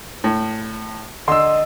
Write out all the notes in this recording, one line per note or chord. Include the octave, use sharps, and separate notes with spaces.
A2
D3 D#5 C6 E6